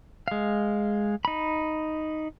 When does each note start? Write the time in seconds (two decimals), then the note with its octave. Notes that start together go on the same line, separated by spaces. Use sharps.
0.28 G#3 F5
1.25 D#4 B5